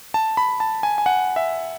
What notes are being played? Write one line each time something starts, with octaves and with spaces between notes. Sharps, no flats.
A5
B5
A5
G#5
G#5
F#5
E5